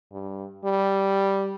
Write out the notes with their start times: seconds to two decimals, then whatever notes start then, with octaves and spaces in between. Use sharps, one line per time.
0.12 G2
0.65 G3